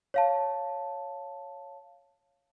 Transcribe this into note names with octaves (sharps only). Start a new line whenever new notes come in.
C#5 F5 A5